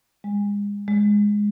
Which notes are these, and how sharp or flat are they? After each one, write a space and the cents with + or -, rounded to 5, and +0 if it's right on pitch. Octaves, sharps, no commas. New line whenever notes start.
G#3 -35
G#3 -5